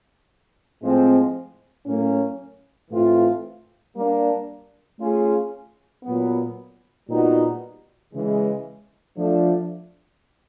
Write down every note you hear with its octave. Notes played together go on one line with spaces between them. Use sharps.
A2 F3 G#3 C4
A2 F#3 A#3 C#4
A2 E3 A3 C4 F4
G3 A#3 D4
A3 C#4 F4 G#4
A#2 F#3 B3
A#2 G3 B3 D#4 F#4
C#3 E3 G#3
F3 A3 D4